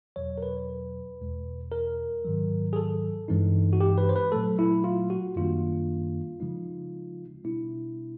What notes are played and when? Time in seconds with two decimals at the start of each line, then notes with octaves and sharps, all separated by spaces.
0.16 E2 B2 F#3 C#5
0.38 A#4
0.43 B4
1.21 E2 B2 G#3
1.72 A#4
2.25 G#2 D#3 F#3
2.73 G#4
2.76 A4
3.28 G2 E3 G#3 C4 D#4
3.73 F#4
3.81 G4
3.98 B4
4.09 C5
4.16 B4
4.32 A#2 F#3 A3 A4
4.59 E4
4.84 F4
5.10 F#4
5.36 F#2 D#3 G3 A#3 D4 F4
6.40 C#3 F3 G#3 C4 D#4
7.44 B2 G3 B3 D4 E4